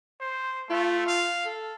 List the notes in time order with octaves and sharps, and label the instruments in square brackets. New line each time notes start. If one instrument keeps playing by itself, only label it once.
[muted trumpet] C5
[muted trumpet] A3 [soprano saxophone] F4
[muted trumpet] F5
[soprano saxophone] A4